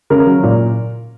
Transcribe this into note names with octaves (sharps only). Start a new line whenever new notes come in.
C#3 A#4
F#3
A#2